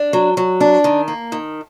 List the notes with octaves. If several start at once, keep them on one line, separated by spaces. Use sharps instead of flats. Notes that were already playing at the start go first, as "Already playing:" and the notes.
Already playing: D4
F#3
F#3
D4
D#3
A#3
D#3